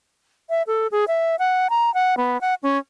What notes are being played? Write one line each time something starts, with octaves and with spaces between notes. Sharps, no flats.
E5
A4
G#4
E5
F#5
A#5
F#5
B3
F#5
C#4